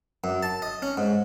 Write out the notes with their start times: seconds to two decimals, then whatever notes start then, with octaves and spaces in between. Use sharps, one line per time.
0.24 F#2
0.43 A5
0.62 D#5
0.82 C#4
0.97 G#2